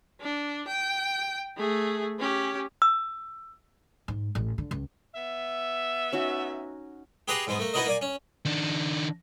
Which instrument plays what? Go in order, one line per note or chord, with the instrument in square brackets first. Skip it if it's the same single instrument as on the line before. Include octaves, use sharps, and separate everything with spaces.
[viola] D4
G5
A3 G#4
C#4 G4
[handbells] E6
[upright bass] G#2
A1
D3
C#2
[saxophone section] B3 E5
[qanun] C#4 D#4 F#4
[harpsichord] G4 G#4 B4 F#5 A#5 C6
G#2 G#3 B3
A3 A#3
B3 D#4 E4 F#4 A#4 D#5
A#3 D5 G#5
C#4
[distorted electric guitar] D#3 D4